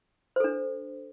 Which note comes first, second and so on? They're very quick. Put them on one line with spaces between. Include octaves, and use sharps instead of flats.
C5 A4 D4